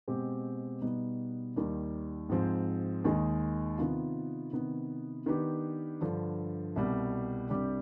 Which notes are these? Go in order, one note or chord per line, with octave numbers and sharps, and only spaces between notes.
B2 G#3 C4 G4
B2 G3 B3 D#4
D#2 D#3 G3
G#2 F3 C4
D#2 D#3 G#3
C3 D#3 B3 F4
C3 D#3 B3
D#3 B3 D4 G4 B4
G2 D3 F3
C2 B2 G3
C2 C3 G3 D4 G4